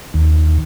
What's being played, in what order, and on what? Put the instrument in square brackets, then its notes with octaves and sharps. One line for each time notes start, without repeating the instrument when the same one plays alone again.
[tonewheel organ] D#2